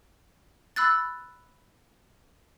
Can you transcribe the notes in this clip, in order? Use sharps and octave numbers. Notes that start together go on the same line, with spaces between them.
B5 E6 F#6 A6